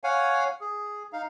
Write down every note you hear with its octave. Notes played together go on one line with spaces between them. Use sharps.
C#5 F5 F#5 G#5
G#4
D#4 F5